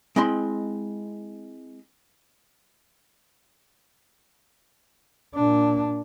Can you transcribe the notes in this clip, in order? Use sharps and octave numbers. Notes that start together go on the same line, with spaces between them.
G#3 C4 E4 D#5 B5 C6
A#2 D4